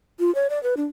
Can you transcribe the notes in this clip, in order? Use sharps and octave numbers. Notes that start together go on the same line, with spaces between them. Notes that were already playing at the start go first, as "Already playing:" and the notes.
F4
C#5
D5
B4
D4